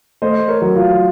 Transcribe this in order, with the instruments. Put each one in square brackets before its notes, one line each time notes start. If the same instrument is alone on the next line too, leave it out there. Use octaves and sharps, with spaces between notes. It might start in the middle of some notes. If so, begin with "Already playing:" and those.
[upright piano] A3 [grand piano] C5 D#5
[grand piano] A#4 C#5
[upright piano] F#3
[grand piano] F4